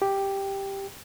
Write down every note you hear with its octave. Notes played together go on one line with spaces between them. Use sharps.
G4